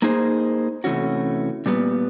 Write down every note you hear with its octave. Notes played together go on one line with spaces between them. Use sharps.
A#3 D#4 G#4 C5
C3 E3 A3 C#4 F#4
A#2 G3 B3